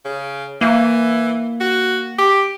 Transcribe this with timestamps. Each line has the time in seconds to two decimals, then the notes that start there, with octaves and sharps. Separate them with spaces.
0.05 C#3
0.61 E3 A#3
1.60 F#4
2.18 G4